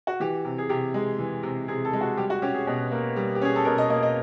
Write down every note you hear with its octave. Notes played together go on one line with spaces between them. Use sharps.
F#4
E3 G4
C3
G#4
C3 G4
G#3
E3
C3
C3 G#4
A4
G#3
F#4
G3 G4
F#4
C#4 G4
G#4
B2
A#3
G3
G4
C#4 G#4
A4
B2 A#4
D#5
A#3 D#5
D#5